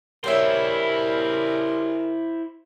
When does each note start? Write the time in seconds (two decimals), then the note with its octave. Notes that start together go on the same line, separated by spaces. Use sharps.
0.24 G3 D4 E4 G#4 A#4 C5 C#5 E5